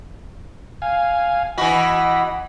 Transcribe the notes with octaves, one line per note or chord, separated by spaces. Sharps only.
F5 G#5
E3 F#4 D#5 B5